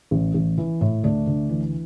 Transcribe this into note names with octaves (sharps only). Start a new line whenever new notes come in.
A1
A1
E3
A2
D2 A3 D4
D2
E3